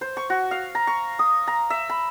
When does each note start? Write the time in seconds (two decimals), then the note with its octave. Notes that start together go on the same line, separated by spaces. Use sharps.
0.01 C5
0.17 C#6
0.30 F#4
0.51 F5
0.75 A#5
0.87 C#6
1.19 D#6
1.47 A#5
1.70 E5
1.89 B5